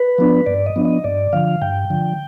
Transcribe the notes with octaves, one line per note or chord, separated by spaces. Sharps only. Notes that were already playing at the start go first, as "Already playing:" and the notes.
Already playing: B4
F3 B3 D4
G2 D5
D#5
F3 B3 D4
D#5
G2 D5
D3 F3 F5
G2 G5
D3 F3